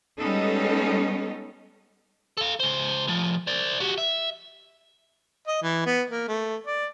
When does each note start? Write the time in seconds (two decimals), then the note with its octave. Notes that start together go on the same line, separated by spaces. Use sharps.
0.18 G3 G#3 B3 C#4 D#4 A4
2.37 A4 F5
2.60 C#3 C5
3.08 A2 F3
3.47 C5 D5
3.80 F#4 G4
3.98 E5
5.47 D#5
5.62 E3
5.86 B3
6.10 A#3
6.28 A3
6.67 D5